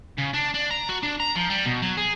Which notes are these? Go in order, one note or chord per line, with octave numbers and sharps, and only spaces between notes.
C#3
D4
D4
A#5
F#4
D4
A#5
F3
G3
B2
F#3
G#4